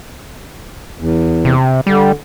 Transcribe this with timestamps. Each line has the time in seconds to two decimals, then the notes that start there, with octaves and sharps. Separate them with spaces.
0.99 E2
1.45 C3
1.87 D3 G3